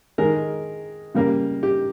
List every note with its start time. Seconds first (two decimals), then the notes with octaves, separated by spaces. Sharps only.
0.18 D#3 G#3 A#4
1.14 C#3 G3 A#3
1.63 G4